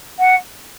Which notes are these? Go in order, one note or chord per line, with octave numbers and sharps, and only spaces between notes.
F#5